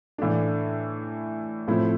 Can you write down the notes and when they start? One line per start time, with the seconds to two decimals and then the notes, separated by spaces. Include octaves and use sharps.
0.18 A2 E3 A3 D4
1.68 A2 F3 A3 C4 E4